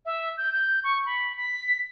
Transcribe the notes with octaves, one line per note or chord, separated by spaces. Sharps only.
E5
G6
G6
C#6
B5
B6